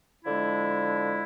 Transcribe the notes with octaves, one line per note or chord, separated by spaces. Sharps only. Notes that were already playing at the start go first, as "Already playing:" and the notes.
D3 F3 G#3 E4